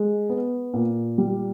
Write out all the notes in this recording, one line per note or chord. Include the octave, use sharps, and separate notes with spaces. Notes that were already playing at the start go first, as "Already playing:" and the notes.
Already playing: G#3
B3
A#2
G3